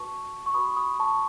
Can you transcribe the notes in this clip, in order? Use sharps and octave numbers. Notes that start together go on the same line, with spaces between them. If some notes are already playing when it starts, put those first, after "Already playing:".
Already playing: F#4 B4 A5 C#6
C#6
F#4 B4 B5 D#6
C#6
B5 D#6
A5 C#6